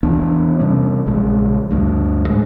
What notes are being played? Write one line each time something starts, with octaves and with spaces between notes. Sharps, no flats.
E2 E3 B3 D4
C3 G3 C#4
A#1 C#3 G#3
D2 G2
A2 G#3